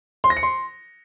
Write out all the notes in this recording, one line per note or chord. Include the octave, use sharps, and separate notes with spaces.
C6
A#6
C#7
C6